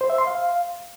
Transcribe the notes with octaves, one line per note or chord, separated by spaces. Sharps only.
C5
E5
C6
F5